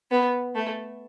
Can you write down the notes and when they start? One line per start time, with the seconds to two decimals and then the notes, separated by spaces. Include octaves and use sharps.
0.11 B3
0.55 A3